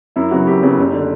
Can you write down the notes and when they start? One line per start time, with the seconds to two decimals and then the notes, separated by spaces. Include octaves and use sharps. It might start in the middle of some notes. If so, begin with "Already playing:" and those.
0.16 F#2 E4
0.31 C#3 F#3 B3 F#4
0.47 F#2 G4
0.62 C#3 F#3 B3
0.78 F#1
0.93 D3